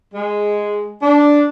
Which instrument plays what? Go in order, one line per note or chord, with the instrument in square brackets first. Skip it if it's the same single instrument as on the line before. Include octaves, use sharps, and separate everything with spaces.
[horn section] G#3
D4